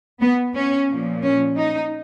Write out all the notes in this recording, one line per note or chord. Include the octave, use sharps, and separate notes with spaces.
B3
C#4
A#2 F3
C#4
D#4